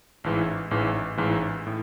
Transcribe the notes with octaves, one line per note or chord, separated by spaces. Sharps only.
A1 G#2 E3
A1 G#2 E3
A1 G#2 E3
A2